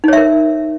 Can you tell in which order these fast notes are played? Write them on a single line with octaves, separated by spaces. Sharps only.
D#4 C#5 E5 A#4